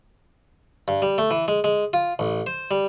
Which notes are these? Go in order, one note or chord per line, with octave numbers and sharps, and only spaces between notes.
G2
G3
A3
E3
G#3
G#3
F4
A1
C5
G3